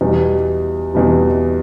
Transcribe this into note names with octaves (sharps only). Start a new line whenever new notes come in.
E2 B2 G3
E2 B2 G3